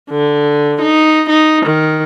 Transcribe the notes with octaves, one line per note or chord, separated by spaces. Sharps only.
D3
D#4
D#4
D#3